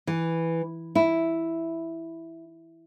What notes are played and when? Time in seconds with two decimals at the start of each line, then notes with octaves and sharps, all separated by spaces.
0.07 E3
0.95 E4